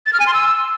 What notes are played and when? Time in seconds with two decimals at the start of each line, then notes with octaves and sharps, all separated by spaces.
0.06 A6
0.13 F6
0.20 G#5
0.27 C6
0.34 E6